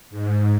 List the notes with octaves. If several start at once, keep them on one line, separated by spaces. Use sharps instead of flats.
G#2